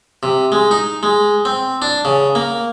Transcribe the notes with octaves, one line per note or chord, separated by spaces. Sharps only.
C3
G#3
D#4
G#3
C4
D4
C#3
A#3